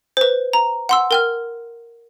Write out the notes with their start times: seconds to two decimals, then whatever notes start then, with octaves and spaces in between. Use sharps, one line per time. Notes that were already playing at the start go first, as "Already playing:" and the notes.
0.17 B4 C5
0.53 A#5
0.89 F#5 C6 E6
1.11 A#4 G5 F6